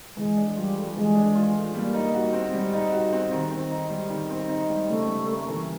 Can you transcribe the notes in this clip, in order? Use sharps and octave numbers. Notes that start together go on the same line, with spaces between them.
E3 G#3
D4
G3 F4
A3
E3 G#3
D4
F4
A3
G3 A#3
D#4
F#4
C4
G3
D#4
F#4
C4
D#3
C4
D#4
G3
D#3
C4
D#4
G3
C#3 A3
G3
A#3
E3